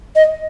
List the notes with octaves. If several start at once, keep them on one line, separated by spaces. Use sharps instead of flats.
D#5